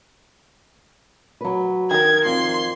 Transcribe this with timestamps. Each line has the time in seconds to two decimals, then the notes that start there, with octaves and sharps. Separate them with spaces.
1.41 F#3 B4
1.91 D#3 A#4 G#6
2.25 F2 C6